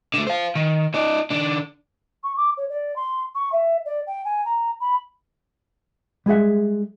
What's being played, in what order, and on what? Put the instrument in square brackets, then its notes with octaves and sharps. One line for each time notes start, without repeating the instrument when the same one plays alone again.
[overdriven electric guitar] D3 A3
C5 F5
D#3
D#4 D5
D#3 D4
[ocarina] C#6
D6
C#5
D5
C6
C#6
E5
D5
G5
G#5
A#5
B5
[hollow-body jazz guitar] G3 G#3 G#4 E5 F#5